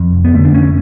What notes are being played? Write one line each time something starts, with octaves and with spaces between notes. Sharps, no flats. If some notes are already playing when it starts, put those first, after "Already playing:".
Already playing: F2
F1
B3
D3 A3
D4
F1 C#4